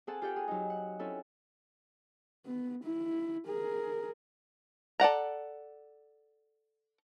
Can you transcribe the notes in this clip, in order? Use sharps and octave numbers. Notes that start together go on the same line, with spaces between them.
C4 G#4 A4 F#5 A5
F4 G4 A4 F#5 G5
G#4
F#3 D#4
F#5
C4 C#4 E4 A4
B3
E4
G#4 A#4
A4 D5 F#5 A#5